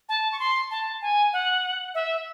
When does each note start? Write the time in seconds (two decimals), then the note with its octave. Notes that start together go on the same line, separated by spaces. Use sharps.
0.09 A5
0.32 C#6
0.40 C6
0.71 A5
1.02 G#5
1.33 F#5
1.95 E5